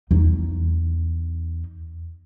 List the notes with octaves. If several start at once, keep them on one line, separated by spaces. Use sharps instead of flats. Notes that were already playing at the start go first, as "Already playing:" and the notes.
E2 D#4